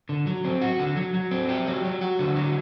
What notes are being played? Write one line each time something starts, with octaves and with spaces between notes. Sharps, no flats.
D3
F#3
C4
F#4
D3
F#3
F#3
C4
G4
F#3
F#3
F#4
D3
F#3